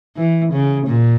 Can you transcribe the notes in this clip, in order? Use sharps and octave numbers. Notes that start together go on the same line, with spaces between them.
E3
C#3
A#2